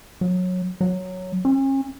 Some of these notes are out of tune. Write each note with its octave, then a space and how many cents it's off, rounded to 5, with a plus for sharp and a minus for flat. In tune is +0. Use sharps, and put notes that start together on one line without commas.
F#3 -20
F#3 -5
C#4 -40